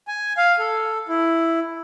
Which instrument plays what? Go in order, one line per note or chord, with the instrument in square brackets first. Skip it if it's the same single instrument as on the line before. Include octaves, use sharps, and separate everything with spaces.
[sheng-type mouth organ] G#5
F5
A4
E4